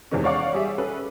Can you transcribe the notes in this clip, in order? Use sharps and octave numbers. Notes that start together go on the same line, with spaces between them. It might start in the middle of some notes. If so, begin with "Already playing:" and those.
E2 C3 D#3 E3 G#3 C#4
C#5 D5 F5 F#5 C#6 D6
G3 G#4 E5
C#4 G#4 A4 B4